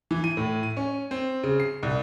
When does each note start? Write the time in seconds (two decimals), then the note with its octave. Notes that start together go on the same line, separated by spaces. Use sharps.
0.11 E3
0.24 D#7
0.37 A2
0.63 D#7
0.77 C#4
1.11 C4
1.43 C#3
1.60 C7
1.83 C2